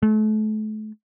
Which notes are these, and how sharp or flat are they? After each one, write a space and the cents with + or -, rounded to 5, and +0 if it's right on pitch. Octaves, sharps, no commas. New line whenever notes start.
A3 -35